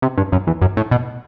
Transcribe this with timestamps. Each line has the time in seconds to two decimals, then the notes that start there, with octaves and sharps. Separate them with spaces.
0.02 C3
0.18 G2
0.32 F#2
0.47 E2
0.61 F#2
0.77 A2
0.91 B2